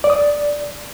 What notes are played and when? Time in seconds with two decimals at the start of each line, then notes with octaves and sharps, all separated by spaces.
0.04 D5
0.10 D#6
0.16 D5